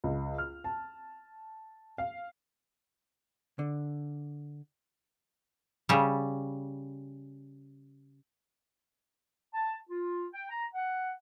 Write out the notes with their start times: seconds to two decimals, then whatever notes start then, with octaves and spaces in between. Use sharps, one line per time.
0.04 C#2
0.38 F6
0.64 A5
1.98 F5
3.59 D3
5.89 C#3 G3
9.54 A5
9.90 F4
10.33 G5
10.49 A#5
10.74 F#5